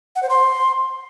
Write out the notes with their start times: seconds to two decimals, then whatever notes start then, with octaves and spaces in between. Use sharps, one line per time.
0.16 F#5
0.23 C5
0.30 C6